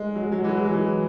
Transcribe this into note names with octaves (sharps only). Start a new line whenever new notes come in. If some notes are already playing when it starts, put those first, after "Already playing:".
Already playing: G#3
F#3
G#3
F#3
G#3
E3
F#3
G#3
F#3
E3